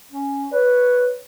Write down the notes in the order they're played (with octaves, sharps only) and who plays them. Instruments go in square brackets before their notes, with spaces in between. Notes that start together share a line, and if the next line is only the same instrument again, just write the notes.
[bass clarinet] C#4
[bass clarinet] B4 [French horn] C#5